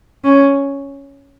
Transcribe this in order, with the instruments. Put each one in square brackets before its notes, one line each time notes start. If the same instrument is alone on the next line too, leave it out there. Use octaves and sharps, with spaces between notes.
[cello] C#4